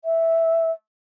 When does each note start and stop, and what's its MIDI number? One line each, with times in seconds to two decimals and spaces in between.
0.04 0.71 76